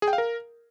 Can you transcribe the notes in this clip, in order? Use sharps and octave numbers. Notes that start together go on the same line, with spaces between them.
G#4
G5
F5
A#4